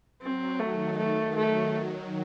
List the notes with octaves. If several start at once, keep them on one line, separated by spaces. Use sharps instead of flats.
F#3 C4
D#3 A3
A3
F#3 A3